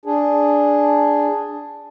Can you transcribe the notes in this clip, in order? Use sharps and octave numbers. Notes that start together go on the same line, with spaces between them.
D4 G#4